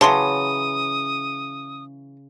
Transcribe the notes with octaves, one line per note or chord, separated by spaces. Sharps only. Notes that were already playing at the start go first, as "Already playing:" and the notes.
C#3 E3 F#3 A5 C6 D#6